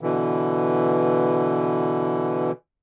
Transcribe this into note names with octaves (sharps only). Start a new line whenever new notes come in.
B2 D3 E3